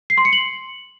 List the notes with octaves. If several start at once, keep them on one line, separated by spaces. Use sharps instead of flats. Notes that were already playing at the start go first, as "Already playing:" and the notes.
C7
C6
C#7
F#7